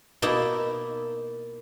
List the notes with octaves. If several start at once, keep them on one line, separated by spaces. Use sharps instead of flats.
B2 A#3 D#4 E4 A5